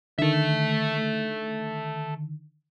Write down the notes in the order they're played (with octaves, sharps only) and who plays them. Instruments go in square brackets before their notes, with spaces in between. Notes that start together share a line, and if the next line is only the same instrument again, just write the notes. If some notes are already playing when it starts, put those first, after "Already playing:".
[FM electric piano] D3 D#3 [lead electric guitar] A4 E5